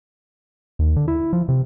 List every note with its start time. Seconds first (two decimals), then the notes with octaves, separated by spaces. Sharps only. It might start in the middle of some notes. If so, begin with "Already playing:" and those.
0.79 D#2
0.96 D3
1.08 E4
1.33 F3
1.49 C3